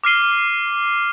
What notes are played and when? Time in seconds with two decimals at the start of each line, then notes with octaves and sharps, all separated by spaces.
0.04 D6 F6 C7 D#7 G7